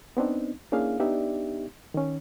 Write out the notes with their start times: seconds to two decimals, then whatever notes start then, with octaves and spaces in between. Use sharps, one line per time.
0.17 B3 C4 D4 D#4
0.72 A#3 C#4 D4 E4 G#4 F5
1.00 B3 D4 D#4 G4 D5 E5
1.94 D#3 C#4